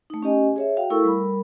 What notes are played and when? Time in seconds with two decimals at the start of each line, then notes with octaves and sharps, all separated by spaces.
0.10 A3 D#4
0.23 C#4 G4 D#5 G#5
0.56 G#4 C#5 E5
0.77 F#4 F5 G5
0.90 A3 E4 A4 A#4 C#6 E6
1.04 G3 A#4 B5